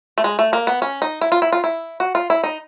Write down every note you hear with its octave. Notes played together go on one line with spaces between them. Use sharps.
A3
G#3
A3
A#3
B3
C#4
D#4
E4
F4
E4
F4
E4
F#4
F4
E4
D#4